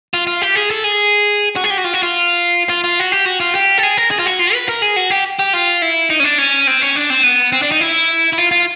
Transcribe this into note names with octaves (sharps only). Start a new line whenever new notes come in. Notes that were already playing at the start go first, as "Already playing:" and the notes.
F4
F4
G4
G#4
A4
G#4
F#4
G#4
G4
F#4
F4
F#4
F4
F4
F4
F#4
G4
F#4
F4
G4
A4
G#4
A#4
G#4
F4
F#4
F4
B4
A#4
G#4
F#4
G4
G4
F4
E4
D#4
C#4
D4
C#4
C4
C#4
D4
C4
B3
C4
D4
D#4
E4
E4
F4
F4